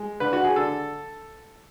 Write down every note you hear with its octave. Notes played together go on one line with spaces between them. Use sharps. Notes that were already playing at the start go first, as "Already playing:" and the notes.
Already playing: G#3
D3 B4
F#4
G#4
D3 A4